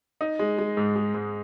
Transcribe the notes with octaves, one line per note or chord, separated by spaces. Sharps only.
D#4
G#3
G#3
G#2
G#3
G#2